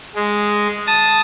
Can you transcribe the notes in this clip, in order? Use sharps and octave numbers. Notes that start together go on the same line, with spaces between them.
G#3
A5 D#6